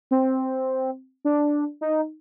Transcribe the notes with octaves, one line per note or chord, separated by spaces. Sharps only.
C4
D4
D#4